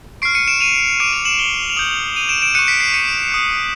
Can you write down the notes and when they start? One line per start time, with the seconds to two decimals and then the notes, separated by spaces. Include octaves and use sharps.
0.22 C#6 F6 C7 D7
0.35 C#7 D#7
0.47 D7 E7
0.60 D#7 F7
1.00 D6 F6 D7 E7
1.13 D#7 F7
1.25 E7 F#7
1.39 F7 G7
1.70 F7
1.77 D#6 G6 E7 F#7
2.16 D#7 F7
2.29 D7 E7
2.42 D7 E7
2.54 F#6 C#7 D#7
2.59 C#6
2.67 B6 C#7
2.80 C7 D7
2.93 C#7 D#7
3.32 D#6 F#6